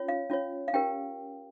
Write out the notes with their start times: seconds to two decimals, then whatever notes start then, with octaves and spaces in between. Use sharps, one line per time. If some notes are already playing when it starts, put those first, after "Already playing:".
Already playing: C#4 F4 C#5
0.08 F5
0.30 C#4 F4 C#5
0.68 F5
0.74 C#4 G4 A#4 G5